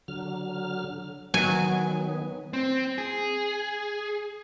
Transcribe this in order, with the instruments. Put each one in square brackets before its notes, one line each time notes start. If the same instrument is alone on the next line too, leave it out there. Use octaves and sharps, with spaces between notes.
[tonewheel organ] D3 F#3 F6
[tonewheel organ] D#3 B3 [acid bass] F#3 [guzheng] G#5
[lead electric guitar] C4
G#4